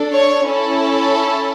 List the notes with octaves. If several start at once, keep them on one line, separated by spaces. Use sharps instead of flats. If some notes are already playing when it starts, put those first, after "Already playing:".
Already playing: D4 A4
C#5
C#4 E4 A4